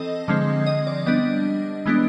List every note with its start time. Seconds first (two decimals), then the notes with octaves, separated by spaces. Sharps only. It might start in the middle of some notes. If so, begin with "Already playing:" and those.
Already playing: E3 C4 A4 D#5
0.28 D3 F3 G#3 C4
0.66 D#5
0.87 D5
1.06 G3 B3 D4 D#5
1.86 E3 G#3 B3 D4